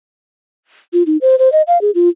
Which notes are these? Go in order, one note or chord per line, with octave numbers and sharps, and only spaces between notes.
F4
D#4
C5
C5
D#5
F5
G#4
F4